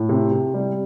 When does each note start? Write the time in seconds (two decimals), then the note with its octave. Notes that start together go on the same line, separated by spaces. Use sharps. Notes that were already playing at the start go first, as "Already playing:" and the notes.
Already playing: A2
0.09 C3
0.32 C3
0.54 G3